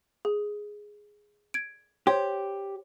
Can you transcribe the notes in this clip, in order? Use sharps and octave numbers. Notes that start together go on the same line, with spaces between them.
G#4
G#6 D7
G4 C5 C#5 C6